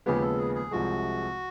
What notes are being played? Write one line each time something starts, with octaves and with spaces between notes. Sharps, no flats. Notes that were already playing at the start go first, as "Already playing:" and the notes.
D#2 C#3 F3 G#3 B3 G4
A4
G#4
G#4
C2 C3 F3 G#3 F#4